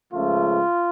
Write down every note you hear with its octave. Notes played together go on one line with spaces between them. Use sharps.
C#2 C#3 F3 A3 F4